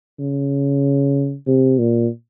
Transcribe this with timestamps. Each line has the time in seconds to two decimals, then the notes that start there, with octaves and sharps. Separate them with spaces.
0.20 C#3
1.47 C3
1.79 A#2